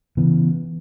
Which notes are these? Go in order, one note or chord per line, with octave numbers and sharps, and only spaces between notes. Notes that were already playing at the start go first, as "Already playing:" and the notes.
C#3 E3 B3